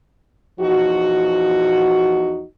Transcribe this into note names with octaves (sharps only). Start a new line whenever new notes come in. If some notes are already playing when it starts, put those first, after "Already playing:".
E2 F3 D#4 F#4